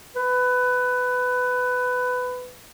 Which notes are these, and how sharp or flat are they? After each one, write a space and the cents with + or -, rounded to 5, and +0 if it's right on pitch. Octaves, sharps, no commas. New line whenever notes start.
B4 +15